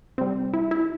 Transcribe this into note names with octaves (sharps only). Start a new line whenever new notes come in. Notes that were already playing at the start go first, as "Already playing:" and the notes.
C3 G3 C4
E4
E4